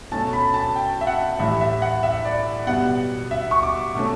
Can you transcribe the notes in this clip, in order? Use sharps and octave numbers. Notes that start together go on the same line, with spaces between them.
B2 A3 C#4 A5
B5
A5
G5
E5
F#5
A2 E3 G3 E5
E5
F#5
E5
D5
B2 G3 B3 F#5
E5
C#6
D6
B2 A3 C#4